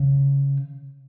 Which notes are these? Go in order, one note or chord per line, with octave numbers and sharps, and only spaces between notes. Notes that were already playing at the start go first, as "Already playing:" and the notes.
Already playing: C#3